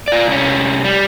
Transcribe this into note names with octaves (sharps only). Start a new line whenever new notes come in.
F4 D5
C2 C#4
G3